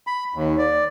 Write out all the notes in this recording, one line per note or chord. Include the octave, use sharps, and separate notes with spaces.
B5
D#2
D5